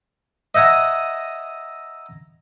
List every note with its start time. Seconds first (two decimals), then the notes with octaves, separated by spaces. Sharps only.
0.55 D#5 E5 F#5 G#5 A#5